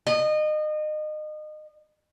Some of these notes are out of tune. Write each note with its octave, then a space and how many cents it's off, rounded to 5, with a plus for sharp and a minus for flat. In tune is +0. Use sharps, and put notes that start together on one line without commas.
D#5 -30